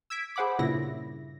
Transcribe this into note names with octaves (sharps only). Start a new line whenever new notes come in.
E6 G#6 B6 D7
G#4 C5 F#5 B5 D6
G2 A#2 C#3 E4 A#6